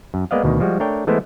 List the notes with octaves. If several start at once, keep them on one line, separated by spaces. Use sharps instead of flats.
F#2
G#3 A#3 B3 D5 D#5 F5
D2 B2 D#3
F3 G3 G#3 F#4
A3 D4 A#4 C#5 G5
E3 G#3 A3 B3 E4 C5